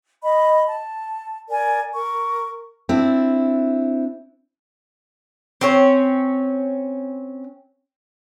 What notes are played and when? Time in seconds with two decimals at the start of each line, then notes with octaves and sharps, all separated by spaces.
0.22 D#5 B5
0.67 A5
1.48 A#4 D5 G#5
1.94 A#4 C#6
2.89 C4 D4 E4
5.61 C4 C#4 C#5